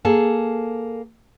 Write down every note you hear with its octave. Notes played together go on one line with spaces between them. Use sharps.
A#3 G#4 A4